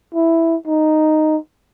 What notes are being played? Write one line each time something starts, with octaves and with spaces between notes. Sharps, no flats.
E4
D#4